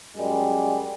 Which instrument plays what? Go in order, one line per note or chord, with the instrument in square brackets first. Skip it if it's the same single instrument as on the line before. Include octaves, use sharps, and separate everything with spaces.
[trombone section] F#2 G3 G#3